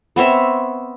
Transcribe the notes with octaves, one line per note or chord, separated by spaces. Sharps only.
B3 C4 C#5 E5